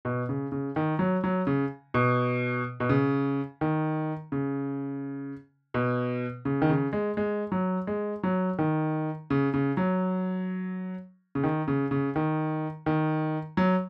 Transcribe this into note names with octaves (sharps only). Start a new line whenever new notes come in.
B2
C#3
C#3
D#3
F#3
F#3
C#3
B2
B2
C#3
D#3
C#3
B2
C#3
D#3
C#3
G#3
G#3
F#3
G#3
F#3
D#3
C#3
C#3
F#3
C#3
D#3
C#3
C#3
D#3
D#3
F#3